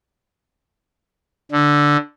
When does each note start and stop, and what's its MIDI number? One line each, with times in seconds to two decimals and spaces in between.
1.52 1.97 50